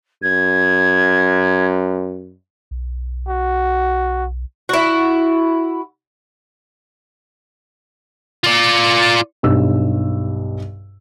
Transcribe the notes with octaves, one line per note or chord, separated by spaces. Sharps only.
F#2 G#6
B1
F#4
E4 F#4
F4 D5
B1 G2 E6